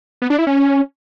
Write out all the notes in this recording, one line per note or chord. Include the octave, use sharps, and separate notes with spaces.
B3
D4
E4
C#4